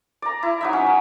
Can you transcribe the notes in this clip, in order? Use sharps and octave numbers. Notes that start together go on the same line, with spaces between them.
D5 A#5
E4
F#3 D#4 E5
C#4
F#5